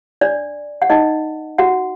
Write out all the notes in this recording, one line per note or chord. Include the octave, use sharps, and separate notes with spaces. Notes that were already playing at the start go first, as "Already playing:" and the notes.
D4 D5
F#5
D#4 D#5
F#4 F#5